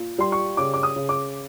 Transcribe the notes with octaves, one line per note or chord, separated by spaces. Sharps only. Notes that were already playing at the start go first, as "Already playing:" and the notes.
Already playing: A#2
G3 C6
C#6
C#3 D6
D6
D#6
C#3
D6